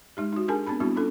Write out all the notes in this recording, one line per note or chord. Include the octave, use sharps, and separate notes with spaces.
G#3 D#4 G4
D#4 F#4
D4 G4 G#4 A#4 G#5 A5
B3 C4 D4 A5 B5
G3 B3 C4 D4 E4 F#4
C#4 D4 F4 A4